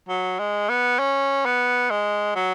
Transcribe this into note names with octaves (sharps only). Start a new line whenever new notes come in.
F#3
G#3
B3
C#4
B3
G#3
F#3